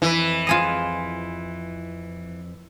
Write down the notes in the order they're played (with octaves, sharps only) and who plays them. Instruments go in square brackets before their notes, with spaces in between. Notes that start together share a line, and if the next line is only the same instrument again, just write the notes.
[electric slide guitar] F2 B4 [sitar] E3
[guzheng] F4 G#4 D#5